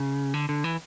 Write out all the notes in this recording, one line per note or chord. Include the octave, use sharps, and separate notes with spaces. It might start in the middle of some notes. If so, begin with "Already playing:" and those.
Already playing: C#3
D3
D3
E3